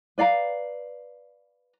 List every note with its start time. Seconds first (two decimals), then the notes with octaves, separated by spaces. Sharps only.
0.18 B4 D5 F5 A#5